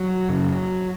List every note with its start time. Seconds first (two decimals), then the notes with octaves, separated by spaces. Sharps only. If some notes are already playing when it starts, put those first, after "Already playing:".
Already playing: F#3
0.29 F#2 C#3